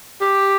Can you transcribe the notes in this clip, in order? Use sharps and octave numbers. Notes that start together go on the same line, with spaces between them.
G4